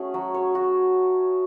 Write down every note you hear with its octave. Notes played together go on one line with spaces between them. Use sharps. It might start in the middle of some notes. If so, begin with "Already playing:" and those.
Already playing: A3 C#4 F#4 G#4
F#3
C#5
F#4